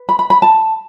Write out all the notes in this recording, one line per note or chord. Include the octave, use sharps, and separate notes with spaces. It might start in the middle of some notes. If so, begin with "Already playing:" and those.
Already playing: B4
B5
B5
B5
A5